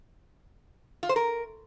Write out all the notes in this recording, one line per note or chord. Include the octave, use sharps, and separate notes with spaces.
F4
C5
A#4